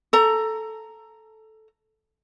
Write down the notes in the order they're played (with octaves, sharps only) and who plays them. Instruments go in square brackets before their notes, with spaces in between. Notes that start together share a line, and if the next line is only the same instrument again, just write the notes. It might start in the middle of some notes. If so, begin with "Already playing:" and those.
[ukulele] A4 A#5